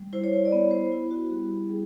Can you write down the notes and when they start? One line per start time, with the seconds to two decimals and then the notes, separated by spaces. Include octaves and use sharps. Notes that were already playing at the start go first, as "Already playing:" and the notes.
Already playing: G3
0.13 E4 C5
0.24 C#5
0.33 C5
0.45 D5
0.51 B3 C#5
0.71 C5
0.92 E4
1.11 F#4
1.30 G3 G4
1.69 G3 G#4